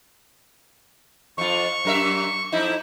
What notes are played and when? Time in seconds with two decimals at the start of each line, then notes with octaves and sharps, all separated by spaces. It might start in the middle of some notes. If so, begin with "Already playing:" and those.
1.38 F2 F4 C#6
1.85 F#2 A#4 E5
2.52 F2 D#4 E4